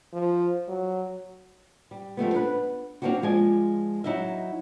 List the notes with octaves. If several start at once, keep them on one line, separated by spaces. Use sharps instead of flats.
F3
F#3
G3
F3 G3 A3 B3
B3 D4 A#4 B4
F#3 A#3 C4 D4 E4 F#4
F3 G#3 D5 G#5
F#3 D#4 E4 D#5 E5